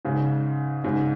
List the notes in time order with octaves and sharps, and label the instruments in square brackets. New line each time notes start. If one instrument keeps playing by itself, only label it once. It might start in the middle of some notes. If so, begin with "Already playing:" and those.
[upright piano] G#2 C#3
G#2 C#3